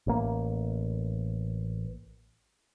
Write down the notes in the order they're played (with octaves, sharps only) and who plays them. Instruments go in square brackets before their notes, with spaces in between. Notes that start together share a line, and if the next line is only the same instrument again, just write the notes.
[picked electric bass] A1 A#3